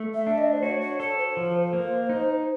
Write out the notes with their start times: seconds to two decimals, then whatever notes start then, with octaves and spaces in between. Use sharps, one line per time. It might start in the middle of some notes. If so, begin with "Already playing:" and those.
Already playing: A3
0.14 E5
0.27 D4
0.38 D#5
0.53 C5
0.62 F#4 C#5
0.81 C#5
0.99 A4 C#5
1.18 C5
1.37 F3
1.73 A#3
2.09 D#4